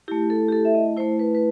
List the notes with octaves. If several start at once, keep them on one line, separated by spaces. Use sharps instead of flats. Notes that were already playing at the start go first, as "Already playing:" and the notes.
A3 E4 G4
A4
G4
A4
E5
D#5
A3 E4 C5
B4
B4